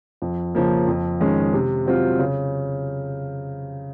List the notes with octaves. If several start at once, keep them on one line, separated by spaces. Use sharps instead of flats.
F2
C#3 F3 A#3
F2
D#3 G#3 C#4
C3
F#3 C4 F4
C#3